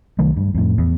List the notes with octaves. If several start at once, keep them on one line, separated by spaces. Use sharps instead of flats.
C2 D#3 F#3 A3
G2
F2 A2
E2